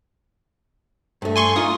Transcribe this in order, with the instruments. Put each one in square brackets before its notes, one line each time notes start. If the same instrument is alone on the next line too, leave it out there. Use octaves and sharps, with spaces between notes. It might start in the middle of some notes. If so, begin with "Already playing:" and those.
[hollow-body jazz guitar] G2 A3
[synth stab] G#5 C6 C#6
[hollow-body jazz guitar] D#4 F4 [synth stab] D#6